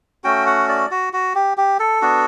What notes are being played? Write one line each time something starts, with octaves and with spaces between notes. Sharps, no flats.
A3 C#4 F#4 G5
F#5
D5
F#4
F#4
G4
G4
A4
B3 D4 F#4